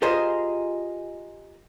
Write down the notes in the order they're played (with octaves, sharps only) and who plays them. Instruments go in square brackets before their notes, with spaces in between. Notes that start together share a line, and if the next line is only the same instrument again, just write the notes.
[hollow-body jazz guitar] F4 G4 G#4 A#4 C5 D#5